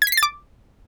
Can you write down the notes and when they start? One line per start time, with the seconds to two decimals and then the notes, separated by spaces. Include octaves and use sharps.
0.02 G#6
0.07 B6
0.12 C7
0.17 A6
0.23 D6